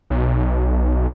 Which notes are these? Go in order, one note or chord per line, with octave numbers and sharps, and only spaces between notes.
B1